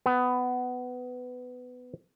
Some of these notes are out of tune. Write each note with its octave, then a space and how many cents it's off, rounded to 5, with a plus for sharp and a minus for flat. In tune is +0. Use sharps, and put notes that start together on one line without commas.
B3 +15